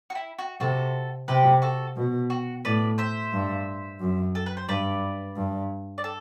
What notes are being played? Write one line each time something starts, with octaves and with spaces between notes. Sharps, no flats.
F#4
E4
F#4
C3 F#4 A4
C3 G4 B4
F#4 A4
B2
F#4
A2 B4 D5
C5 E5
G2
F#2
A4
B4
C5
G2 B4 D5
G2
D5
A4